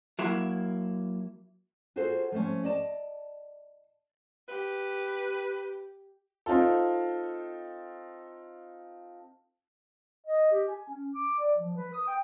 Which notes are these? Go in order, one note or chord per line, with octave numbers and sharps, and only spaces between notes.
F#3 A#3 E4
F4 F#4 G#4 A4 C5
F3 A3 C#4
D5 D#5 A5
G4 B4
C4 D#4 F4 A4
D#5
G4
G#5
C#4
D6
D5
F3
B4
D#6
G5